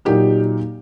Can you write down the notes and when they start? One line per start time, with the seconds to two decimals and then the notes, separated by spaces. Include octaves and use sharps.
0.05 A#2 F#3 A#3 D#4 G4